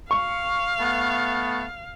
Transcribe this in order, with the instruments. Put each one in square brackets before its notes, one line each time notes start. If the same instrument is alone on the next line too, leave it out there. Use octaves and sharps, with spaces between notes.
[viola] F5 [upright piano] C#6
[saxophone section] A3 B3